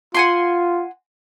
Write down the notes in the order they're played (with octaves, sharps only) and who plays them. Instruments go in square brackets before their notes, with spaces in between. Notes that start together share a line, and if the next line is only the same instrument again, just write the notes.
[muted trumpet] F4 [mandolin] F#5 G#5 C6